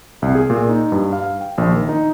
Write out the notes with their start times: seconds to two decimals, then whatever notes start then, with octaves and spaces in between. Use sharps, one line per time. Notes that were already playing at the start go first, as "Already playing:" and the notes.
0.22 C2
0.35 G#4
0.50 A#2
0.69 D#4
0.92 G2
1.13 F5
1.41 G5
1.58 A#1
1.73 D#3
1.89 D#4